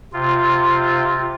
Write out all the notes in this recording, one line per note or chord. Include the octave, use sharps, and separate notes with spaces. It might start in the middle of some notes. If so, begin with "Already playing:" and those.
C3 F4